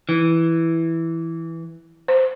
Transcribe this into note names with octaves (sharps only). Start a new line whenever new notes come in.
E3
C5